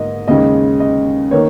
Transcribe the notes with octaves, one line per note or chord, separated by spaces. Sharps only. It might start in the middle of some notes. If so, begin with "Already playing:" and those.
Already playing: G#2 A#3 D#5
D#2 C#3 G#3 D#5
D#5
D#3 A#3 C#5